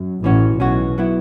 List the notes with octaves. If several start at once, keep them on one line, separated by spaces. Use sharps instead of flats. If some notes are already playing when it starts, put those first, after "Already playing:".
Already playing: F#2
A1 A2 E3 C#4 F#4
B1 B2 E3 C#4 F#4
F#3 B3 E4